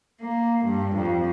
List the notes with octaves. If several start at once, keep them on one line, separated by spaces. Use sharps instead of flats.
A#3
G2
F2